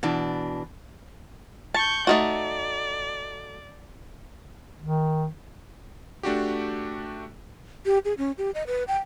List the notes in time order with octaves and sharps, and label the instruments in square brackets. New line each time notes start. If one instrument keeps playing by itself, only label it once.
[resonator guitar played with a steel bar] B2 E3 D4
[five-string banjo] A5 [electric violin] C#6 G6
[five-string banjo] A3 D#4 F#4 [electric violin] D5
[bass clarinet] D#3
[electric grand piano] A3 D4 F#4 G4
[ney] G4
G#4
C#4
G4
D#5
B4
G5